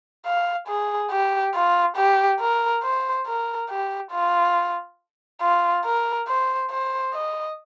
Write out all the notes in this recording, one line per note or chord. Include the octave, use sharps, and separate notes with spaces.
F5
G#4
G4
F4
G4
A#4
C5
A#4
G4
F4
F4
A#4
C5
C5
D#5